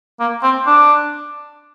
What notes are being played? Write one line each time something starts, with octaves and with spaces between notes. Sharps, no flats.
A#3
C4
D4